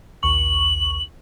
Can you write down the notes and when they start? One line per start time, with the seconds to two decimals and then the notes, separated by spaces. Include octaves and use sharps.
0.23 A#1 D#2 C#6 F#7